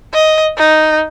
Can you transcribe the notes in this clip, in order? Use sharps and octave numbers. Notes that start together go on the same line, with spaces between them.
D#5
D#4